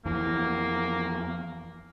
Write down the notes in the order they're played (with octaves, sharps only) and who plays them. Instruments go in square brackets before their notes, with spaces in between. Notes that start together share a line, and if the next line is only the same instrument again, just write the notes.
[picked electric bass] F2 E3 [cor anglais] A#3